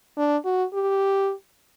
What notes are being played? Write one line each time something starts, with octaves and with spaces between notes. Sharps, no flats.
D4
F#4
G4